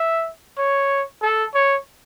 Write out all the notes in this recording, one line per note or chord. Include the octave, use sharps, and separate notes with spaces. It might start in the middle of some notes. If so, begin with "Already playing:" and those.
Already playing: E5
C#5
A4
C#5